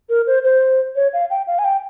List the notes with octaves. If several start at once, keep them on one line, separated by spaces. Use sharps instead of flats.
A#4
C5
C5
C#5
F5
G5
F5
G#5
G5